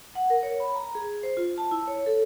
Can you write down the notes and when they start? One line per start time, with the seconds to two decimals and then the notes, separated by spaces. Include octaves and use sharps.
0.15 F#5
0.30 A#4
0.43 C#5
0.60 B5
0.75 A#5
0.95 G#4
1.23 C5
1.37 F4
1.58 A5
1.71 E4
1.88 C#5
2.06 A4